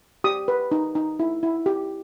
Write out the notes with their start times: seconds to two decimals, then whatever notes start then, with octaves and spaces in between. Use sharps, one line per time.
0.24 G4 D#6
0.48 B4
0.72 D#4
0.95 D#4
1.20 E4
1.43 E4
1.66 G4